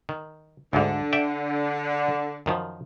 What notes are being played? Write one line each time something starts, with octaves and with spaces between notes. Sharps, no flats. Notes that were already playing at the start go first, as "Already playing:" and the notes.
D#3
D2 G#2 D3
D5 E5 G5
F#2 D#3 F3